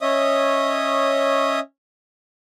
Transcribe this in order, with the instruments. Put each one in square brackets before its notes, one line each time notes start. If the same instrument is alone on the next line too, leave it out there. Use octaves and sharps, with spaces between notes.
[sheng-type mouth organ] C#4 C#5 D#5 E5 D#6